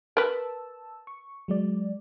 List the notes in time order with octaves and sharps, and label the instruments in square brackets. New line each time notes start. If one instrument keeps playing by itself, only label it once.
[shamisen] A#4 B4 [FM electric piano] A5 E6
[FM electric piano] C#6
F#3 G#3 D5